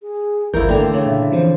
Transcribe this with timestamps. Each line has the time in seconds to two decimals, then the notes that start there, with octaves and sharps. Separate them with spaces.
0.03 G#4
0.54 G#1 D#2 E3 F3 E4 A#4 G6
0.69 D3 A3 A#3 D4 G5 A#5 C6
0.93 C#3 C#5
1.06 A#2 E5
1.32 E3 F3 C4 C5